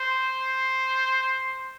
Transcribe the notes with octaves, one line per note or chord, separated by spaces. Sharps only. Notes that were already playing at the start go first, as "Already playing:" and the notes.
Already playing: C5